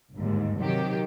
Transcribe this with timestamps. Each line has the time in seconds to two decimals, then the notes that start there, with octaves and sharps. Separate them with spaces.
0.15 G1 D#2 G#2
0.61 C3 D#3 F#3 G4